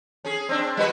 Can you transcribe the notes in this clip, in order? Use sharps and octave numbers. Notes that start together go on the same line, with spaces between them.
C#4 G#4
C4 D4
G3 F#4 B4